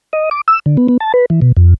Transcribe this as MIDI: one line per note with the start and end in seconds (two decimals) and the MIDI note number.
0.13 0.29 75
0.31 0.41 86
0.48 0.59 88
0.66 0.77 50
0.77 0.88 59
0.89 0.97 59
1.00 1.12 81
1.14 1.25 71
1.30 1.40 52
1.42 1.52 47
1.57 1.74 41